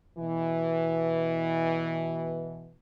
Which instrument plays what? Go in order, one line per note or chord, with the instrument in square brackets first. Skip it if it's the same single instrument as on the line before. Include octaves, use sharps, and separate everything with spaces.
[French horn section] B2 E3